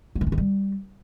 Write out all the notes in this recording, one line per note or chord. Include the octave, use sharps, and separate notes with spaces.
F#3
D#3
C#4
D#3
G3